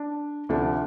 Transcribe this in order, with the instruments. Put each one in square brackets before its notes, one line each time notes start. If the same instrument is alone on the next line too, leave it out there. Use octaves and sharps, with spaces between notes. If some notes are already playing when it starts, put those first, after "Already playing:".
Already playing: [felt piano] D4
D2 C3 F3 A3 D4